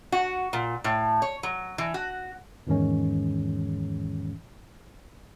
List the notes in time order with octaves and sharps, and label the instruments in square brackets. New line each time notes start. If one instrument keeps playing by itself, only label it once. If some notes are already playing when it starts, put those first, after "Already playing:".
[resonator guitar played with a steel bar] F#4
A#2
A2
C#5
F#3
E3
F#4
[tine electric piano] E2 G#2 D#3 E3 G#3 C#4